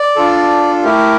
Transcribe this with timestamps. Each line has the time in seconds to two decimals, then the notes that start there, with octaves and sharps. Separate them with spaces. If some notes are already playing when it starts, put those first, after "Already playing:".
Already playing: D5
0.16 D4 F4 A4
0.84 A3 E4 G4 A#4